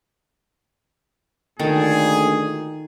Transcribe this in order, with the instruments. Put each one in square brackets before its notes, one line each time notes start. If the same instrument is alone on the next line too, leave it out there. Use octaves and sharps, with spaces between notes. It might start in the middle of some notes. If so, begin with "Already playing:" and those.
[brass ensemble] D2 A#2 [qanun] D#3 A4 [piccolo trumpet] G#4